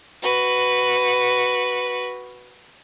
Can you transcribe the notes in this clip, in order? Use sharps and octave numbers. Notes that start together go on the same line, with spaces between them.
F#4 B4